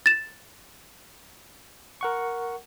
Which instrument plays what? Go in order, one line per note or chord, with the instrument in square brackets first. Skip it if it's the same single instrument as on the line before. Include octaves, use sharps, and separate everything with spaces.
[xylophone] A6 E7
[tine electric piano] A#4 F#5 C#6